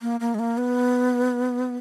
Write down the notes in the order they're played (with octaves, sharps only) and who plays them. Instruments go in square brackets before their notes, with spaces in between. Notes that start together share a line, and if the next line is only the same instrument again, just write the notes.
[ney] A#3
A#3
G#3
A#3
B3